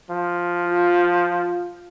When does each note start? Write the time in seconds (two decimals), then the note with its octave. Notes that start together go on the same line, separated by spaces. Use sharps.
0.10 F3
0.68 F4